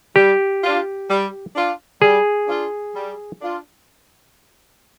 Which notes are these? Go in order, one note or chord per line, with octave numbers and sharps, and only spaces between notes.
G3 G4
D4 F4
G3
D4 F4
G3 G#4
D4 F4
G3
D4 F4